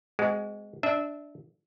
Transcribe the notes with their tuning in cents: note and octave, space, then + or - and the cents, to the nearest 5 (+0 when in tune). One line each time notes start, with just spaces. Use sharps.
G#3 +0 C4 -35 F#4 +25
D4 +0 E5 -20